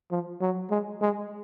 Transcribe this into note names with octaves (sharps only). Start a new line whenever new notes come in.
F3
F#3
G#3
G#3